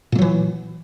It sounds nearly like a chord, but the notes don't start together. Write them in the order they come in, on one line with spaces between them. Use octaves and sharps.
A#2 A3 F#3 E3